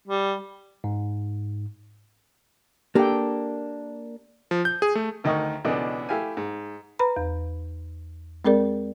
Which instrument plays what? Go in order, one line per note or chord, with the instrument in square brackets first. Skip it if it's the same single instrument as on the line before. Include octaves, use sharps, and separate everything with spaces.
[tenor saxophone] G3
[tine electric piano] G#2
[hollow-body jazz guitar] A#3 D4 [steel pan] G4 A4 G5
[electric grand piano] F3
G6
G#4
A3
[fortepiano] D2 D#3 D#4 D#5 C#6
C#2 B2 E3 D4 A4 D#5
A3 E4 G4 F5 G#5
G#2
[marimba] B4 A#5 B5
E2
G#3 C4 G#4 A#4 D5